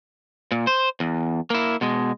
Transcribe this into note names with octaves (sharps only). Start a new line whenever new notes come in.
A#2
C5
E2
A#3 E4
B2 G#3